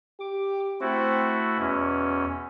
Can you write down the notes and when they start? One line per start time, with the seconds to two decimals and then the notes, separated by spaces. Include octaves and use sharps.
0.20 G4 D6
0.81 A3 C4 E4 F#4
1.58 E2 B2 C#4